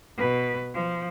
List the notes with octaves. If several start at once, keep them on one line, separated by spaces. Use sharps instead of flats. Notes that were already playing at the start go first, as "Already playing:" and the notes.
B2 B4
F3